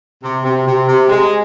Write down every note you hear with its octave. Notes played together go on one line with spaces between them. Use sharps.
C3
C3
C3
C3
G#3